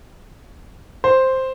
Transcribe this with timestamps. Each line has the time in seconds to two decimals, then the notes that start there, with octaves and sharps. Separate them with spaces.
1.04 C5